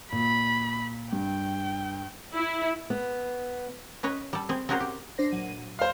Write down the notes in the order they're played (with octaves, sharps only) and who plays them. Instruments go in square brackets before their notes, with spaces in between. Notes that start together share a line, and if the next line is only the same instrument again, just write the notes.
[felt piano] A#2 [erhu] B5
[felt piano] G2 [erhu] G5
[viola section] E4
[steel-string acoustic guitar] B3
[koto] C#4 B4 C#5 D#5
G3 A4
C4 G#4
C4 C#4 F#4 G#4 A#4 C5
G4
[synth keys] D4 C5 A#6
A#2 F#3 D#7
[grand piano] C5 F5 [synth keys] C6